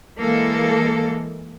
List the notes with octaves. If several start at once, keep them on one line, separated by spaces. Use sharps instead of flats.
E3 G#3 A#3 A4